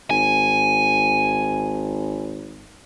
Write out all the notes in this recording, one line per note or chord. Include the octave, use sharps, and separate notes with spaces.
G#1 G#5